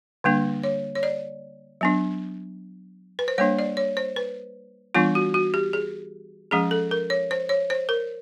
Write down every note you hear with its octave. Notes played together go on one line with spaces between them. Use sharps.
D3 G3 A#3 D4
C#5
C#5
D5
F#3 B3 D4
B4
C5
G3 A#3 D4 C#5
D5
C#5
C5
B4
E3 G3 B3 D4 F4
F#4
F#4
G4
G#4
F3 G#3 C#4 G#4
A4
A#4
C#5
C5
C#5
C5
A#4